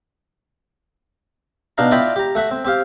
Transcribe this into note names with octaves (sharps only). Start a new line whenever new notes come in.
B2 D4 D#4 F5 A#5
E4 F4 D5 D#5 G5 B5
G4 A#5
A3 F#4 E5
C4
C4 G4 F5